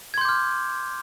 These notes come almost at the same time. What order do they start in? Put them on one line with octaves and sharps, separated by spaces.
G#6 C6 G6 D6 F6